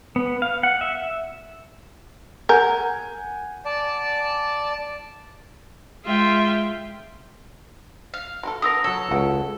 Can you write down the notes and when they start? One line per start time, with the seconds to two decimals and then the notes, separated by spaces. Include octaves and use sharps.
0.16 B3
0.42 F5
0.63 F#5
0.81 E5
2.49 A#4 F#5 G#5 G6
3.65 D5 A5
6.03 G#3 F4 E5 G5
8.14 F5
8.43 F#4 G4 A4
8.62 D3 A#3 B3 A#4 D#6 E6 A#6
8.84 F#3 A4 C#5
9.11 C#2 F#4 F#5 G5